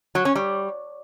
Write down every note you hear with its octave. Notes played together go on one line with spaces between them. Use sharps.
F#3
C#4
G3